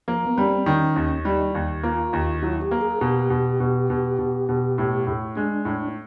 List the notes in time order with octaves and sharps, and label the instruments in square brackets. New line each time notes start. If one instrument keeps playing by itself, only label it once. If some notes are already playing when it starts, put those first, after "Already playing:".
[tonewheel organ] F3 [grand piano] A#3
[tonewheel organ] B3
[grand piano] G3 [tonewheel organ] C#4
[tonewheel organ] C4
[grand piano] D#3 [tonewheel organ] C#4
[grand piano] D#2
[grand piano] G3 [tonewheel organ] D#4
[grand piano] D#2
[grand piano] A#3 [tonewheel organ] F4
[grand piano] D#2
[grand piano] F#3 [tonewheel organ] E4
[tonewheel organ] G4
[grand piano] A#3
[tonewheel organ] G#4
[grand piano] B2 [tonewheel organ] G4
[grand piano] B2
B2
B2
B2
B2
A2
A2
[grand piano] G#3 [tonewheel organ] D4
[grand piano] A2